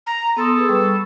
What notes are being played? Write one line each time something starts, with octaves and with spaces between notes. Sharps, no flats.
A#5
B3 A4 C6 D#6
G#4 B4 D#6
G3 B5 C#6